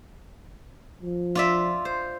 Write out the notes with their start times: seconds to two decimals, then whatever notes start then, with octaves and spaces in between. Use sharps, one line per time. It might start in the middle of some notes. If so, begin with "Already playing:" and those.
1.03 F3
1.35 F4 D5 E5
1.85 C5